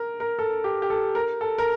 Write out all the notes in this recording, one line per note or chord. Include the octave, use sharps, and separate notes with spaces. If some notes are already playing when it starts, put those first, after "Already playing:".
Already playing: A#4
A#4
A4
G4
G4
A4
A#4
A4
A#4